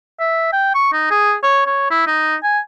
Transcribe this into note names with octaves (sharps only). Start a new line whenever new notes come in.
E5
G5
C#6
D#4
G#4
C#5
C#5
E4
D#4
G#5